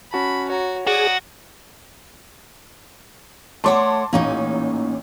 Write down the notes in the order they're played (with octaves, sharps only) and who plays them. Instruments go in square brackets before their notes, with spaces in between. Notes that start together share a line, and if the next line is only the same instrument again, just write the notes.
[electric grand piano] C#4 F#4 A5 [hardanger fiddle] B5
[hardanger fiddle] F#4 [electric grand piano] C#5 A#5
[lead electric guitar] F#4 [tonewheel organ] G#4 [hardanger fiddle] D5 D#6
[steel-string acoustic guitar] A3 C#5 F#5 [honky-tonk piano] A5 C6 D6
[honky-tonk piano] A1 A#2 [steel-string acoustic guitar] A#3 C#4 D#4